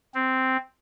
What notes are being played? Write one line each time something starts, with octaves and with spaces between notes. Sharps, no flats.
C4